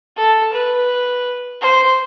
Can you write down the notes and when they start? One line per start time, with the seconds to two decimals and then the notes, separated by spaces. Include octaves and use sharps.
0.17 A4
0.53 B4
1.61 C5